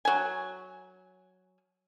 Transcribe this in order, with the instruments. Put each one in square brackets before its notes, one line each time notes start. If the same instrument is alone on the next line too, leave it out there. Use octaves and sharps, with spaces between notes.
[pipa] F#3 G#5